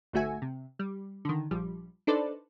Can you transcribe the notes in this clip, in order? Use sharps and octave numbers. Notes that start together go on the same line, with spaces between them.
G#1 D2 A3 F#4 E5 G#5
C3
G3
D3 D#3
A#1 F3 G3
D4 D#4 A4 B4 C5 D5